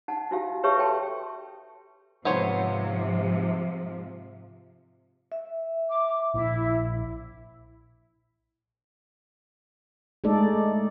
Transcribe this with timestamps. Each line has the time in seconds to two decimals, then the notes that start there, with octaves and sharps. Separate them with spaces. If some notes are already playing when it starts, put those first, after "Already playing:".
0.08 D#4 F#5 A5
0.31 D#4 E4 F#4 G4 F5
0.63 G4 B4 C#5 E5 A5 C#6
0.78 A4 C#5 G5 A5 C6
2.25 G#2 C3 F3 B3 C5 C#5
5.32 E5
5.89 D6
6.34 A#1 E4
10.24 G#3 A3 D#4 A4 D5